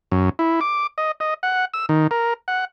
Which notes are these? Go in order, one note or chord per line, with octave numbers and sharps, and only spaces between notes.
F#2
E4
D6
D#5
D#5
F#5
E6
D#3
A#4
F#5